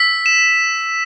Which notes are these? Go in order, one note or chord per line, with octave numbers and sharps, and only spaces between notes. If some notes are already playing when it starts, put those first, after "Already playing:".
Already playing: E6 B6
E7